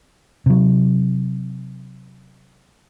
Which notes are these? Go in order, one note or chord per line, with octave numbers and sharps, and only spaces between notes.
C3 F#3